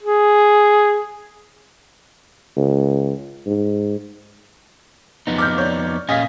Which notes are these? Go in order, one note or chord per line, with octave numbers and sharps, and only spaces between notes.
G#4
C#2
G#2
F2 B3 D#4
D6 F6 G6
C#5 D5
A#2 C#4 D#5 F5 G#5 B6